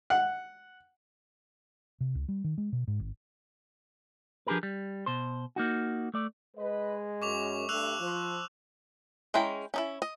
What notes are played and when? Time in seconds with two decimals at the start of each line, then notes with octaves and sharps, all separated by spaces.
0.10 F#5
2.01 C3
2.15 C#2
2.29 G3
2.44 D#3
2.58 G#3
2.73 B2
2.88 G#2
3.00 G#1
4.47 F3 D4 G4 G#4 A#4 B4
4.63 G3
5.06 B2 C5
5.56 A#3 D#4 F#4
6.14 A3 D5
6.56 G#3 B4 D#5
7.22 F#2 C#6 D6 F7
7.69 G2 A3 E6 F#6 F7
8.01 F3
9.34 G#3 C#4 E4 G5 A#5
9.74 C#4 D#4 E4
10.02 D#5